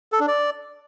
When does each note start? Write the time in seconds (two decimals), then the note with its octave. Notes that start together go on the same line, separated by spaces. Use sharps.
0.12 A4
0.20 D4
0.28 D5